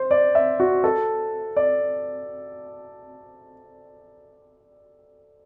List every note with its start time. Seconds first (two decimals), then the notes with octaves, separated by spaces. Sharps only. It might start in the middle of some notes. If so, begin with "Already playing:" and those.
Already playing: C5
0.11 D5
0.35 E5
0.60 F#4
0.84 A4
1.56 D5